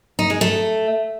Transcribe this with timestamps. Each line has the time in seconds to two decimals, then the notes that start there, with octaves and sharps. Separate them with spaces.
0.19 D#4
0.30 G#3
0.41 A3